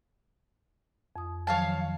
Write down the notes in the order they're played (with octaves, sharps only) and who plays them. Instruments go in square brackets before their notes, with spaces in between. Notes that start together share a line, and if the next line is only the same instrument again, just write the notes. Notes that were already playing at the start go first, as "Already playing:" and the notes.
[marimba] F2 D#6
[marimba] D#3 F3 F#3 [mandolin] C#5 F5 A5